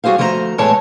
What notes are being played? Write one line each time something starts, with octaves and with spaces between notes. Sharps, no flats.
G3 F#4 G#4 C5 F5
D2 F3 A3 C5 D#5 A#5
E2 A2 G#3 A4 C#5 A5